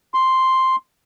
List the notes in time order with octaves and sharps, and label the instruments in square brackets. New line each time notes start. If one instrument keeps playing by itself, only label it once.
[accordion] C6